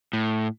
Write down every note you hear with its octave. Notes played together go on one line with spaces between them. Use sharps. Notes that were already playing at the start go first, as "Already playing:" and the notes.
A2